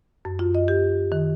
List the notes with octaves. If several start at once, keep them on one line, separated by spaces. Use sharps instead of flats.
F#2
F4
D#5
G4
D#3